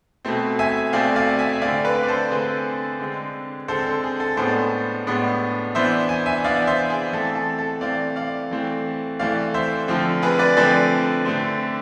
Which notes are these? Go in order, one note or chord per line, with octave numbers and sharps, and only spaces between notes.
B2 A3 C4
E5 G#5
B2 A3 C4 D5 F5
D5 F5
E5 G#5
E5
D3 A3 C4 D5 F5
B4 D5
D5
A4 C5
D3 A3 C4 G#4 B4
D3 G#3 C4
D3 G#3 C4 A4 C5
A4
G#4
A4
A2 G#3 B3 D4 A4 C5
A2 G#3 B3 D4
E3 B3 D4 C5 E5
G#5
E5 G#5
E3 B3 D4 D5 F5
C5 E5
G#4
E3 A3 C4 A4
A4
A4
E3 A3 C4 D5 F5
D5 F5
E3 A3 C4
E3 A3 C4 D5 F5
C5 E5
D3 F3 A3 C4
G#4 B4
B4 D5
D3 F3 A3 C4 B4 D5
D3 A3 C4